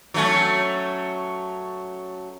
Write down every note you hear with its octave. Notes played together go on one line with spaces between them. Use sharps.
F#3 A3 C#4